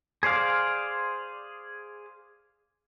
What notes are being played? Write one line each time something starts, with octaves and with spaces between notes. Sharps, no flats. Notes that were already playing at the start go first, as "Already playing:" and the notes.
G#4 C5 D5 F5